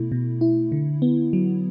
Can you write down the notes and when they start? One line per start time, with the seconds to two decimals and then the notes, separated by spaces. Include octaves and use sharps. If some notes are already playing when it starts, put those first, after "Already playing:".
Already playing: B2 A3 E4
0.12 B2
0.41 E4
0.72 D3
1.02 B3
1.33 F#3